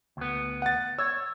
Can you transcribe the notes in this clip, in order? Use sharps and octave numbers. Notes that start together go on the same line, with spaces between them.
D2 B3
F#5 A6
C#5 E6